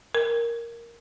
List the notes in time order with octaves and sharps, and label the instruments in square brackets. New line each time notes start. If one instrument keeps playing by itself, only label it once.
[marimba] A#4